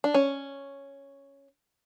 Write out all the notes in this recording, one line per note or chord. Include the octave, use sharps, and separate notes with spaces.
D4
C#4